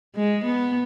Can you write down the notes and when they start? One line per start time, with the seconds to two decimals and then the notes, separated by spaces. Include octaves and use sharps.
0.15 G#3
0.44 B3